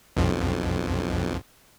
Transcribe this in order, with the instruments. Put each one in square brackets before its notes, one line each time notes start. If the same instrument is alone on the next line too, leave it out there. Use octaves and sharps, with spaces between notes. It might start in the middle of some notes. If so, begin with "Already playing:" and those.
[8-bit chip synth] B1 F2